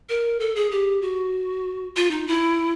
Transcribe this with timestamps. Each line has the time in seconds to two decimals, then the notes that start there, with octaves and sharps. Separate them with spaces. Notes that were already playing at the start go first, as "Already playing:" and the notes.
0.09 A#4
0.40 A4
0.56 G#4
0.71 G4
1.02 F#4
1.96 F4
2.11 D#4
2.28 E4